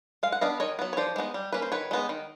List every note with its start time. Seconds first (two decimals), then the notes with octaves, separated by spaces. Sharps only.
0.23 G#3 F5
0.32 F#5
0.41 B3 D4 D#5 F5
0.60 D#3 C#5 D#5
0.79 F#3 B3
0.93 C#5
0.97 F3 C5 D5
1.16 G#3 B3 D#4
1.34 G3
1.53 A#3 C#4 B4
1.62 C5
1.72 D#3 B4 C#5
1.91 G#3 B3 D#4
2.09 D#3